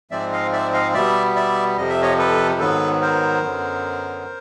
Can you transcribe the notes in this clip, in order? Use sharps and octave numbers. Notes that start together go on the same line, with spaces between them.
G#2 F3 G#3 C4 D5 E5
D#5 F5
D5 E5
D#5 F5
B2 G3 B3 D5 E5
D5 E5
F2 C3 F3 D#5
E5
C#5 D#5
A4 B4
G#2 D#3 F#3 B3 A4 B4
A#4 C5
F#2 D3 F#3 B3